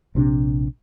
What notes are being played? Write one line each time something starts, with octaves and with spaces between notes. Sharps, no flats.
A#1 C3 C#4 D4